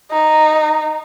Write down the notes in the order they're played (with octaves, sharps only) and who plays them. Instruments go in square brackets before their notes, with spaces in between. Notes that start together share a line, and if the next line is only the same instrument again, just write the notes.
[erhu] D#4